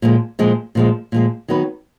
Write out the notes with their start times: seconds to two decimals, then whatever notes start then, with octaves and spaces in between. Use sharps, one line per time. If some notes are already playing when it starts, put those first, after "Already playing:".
0.02 A#2 F3 G#3
0.39 A#2 F3 G#3
0.75 A#2 F3 G#3
1.12 A#2 F3 G#3
1.48 D#3 F#3 B3 F#4 B4